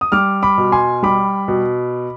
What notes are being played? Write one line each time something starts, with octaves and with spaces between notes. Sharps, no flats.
D#6
G3 D6 F6
B5 D6
B2
G#5 C6
G3 B5 D6
B2